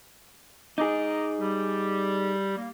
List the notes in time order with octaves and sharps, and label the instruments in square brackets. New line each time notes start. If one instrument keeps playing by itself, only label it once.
[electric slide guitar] D#4 G#4 [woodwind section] D#5 A#5 D6
[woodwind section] G3 G4
A#3